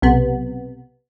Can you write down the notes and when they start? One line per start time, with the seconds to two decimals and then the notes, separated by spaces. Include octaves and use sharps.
0.02 B1 C3 B3